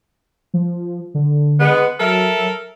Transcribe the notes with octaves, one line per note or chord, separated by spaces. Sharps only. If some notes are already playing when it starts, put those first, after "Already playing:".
F3
D3
G#3 B3
F#3 A4 A#4 E5